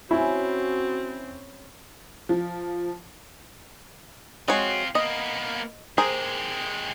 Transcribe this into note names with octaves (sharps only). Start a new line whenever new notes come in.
C4 C#4 E4 F#4 B5
F3
G#3 C4 F4 F#4 C#5
A#3 B3 D#5
G#3 G4 G#4 A#4 C5